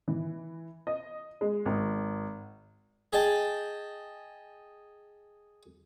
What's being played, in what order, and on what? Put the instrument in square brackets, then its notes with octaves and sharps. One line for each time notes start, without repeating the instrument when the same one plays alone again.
[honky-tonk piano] E3
D#5
G#3
G#1
[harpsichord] G#4 D#5 G5 A5